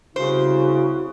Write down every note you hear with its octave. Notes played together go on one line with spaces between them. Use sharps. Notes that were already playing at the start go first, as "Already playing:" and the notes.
C2 C#3 E4 F#4 C5